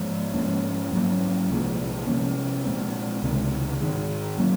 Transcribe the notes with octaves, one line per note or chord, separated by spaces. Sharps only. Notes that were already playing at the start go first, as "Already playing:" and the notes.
Already playing: G#2 F3 G#3
G#2 F3 A#3 C#4
G#2 F#3 A#3 C#4
C2 A#2 F3 G#3
C3 F3 A#3 C#4
A#2 G#3 C4
C#2 C3 D#3
G#2 D#3 G#3
F#3 A#3 C#4